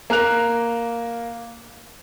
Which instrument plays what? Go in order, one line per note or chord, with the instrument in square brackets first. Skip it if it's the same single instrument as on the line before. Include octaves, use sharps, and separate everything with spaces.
[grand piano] A#3 A#4 F#6 F7